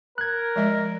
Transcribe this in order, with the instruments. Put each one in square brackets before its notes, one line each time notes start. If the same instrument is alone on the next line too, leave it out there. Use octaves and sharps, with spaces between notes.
[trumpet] A#4 [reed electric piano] F#6 G#6
[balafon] F3 G#3 D#5